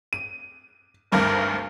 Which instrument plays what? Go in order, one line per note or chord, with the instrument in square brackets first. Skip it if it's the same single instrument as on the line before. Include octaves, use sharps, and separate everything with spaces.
[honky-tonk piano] D#7
[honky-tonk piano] G#1 D2 G2 [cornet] A#4